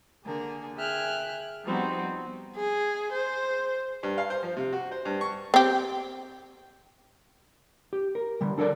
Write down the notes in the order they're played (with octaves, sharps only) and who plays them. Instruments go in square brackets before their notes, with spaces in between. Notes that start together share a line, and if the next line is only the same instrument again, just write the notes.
[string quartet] D3 A#3 G#4 A#4
G#4 E5 G5 F6 F#6
F3 G3 B3 C4 D#4 F#4
[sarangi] G#4
C5
[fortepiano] G2
F5
C5
F3
C3
F#4
C5
G2
C#6
[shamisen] C4 G4
[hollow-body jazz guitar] G4
A#4
D3 G3
D4 A4 A#4 D5